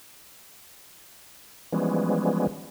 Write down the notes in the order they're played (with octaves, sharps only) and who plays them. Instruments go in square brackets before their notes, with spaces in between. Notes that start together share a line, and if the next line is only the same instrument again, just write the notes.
[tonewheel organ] E3 F3 G3 G#3 B3 C#4